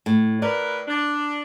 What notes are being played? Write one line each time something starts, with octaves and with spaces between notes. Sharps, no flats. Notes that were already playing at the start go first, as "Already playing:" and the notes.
A2
A2 A#4 B4 D5
D4